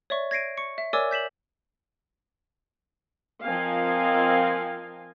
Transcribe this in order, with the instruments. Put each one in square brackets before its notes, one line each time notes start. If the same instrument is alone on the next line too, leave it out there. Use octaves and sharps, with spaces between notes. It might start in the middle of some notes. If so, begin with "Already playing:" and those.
[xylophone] C#5 D5 E5 C#6
G#6 A#6 C7 D7 D#7
C#6 C#7
E5
A#4 C#5 D5 G#5 D6 E6
G6 B6 E7 F#7
[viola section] F3 C4 A#4 D#5 F5 G#5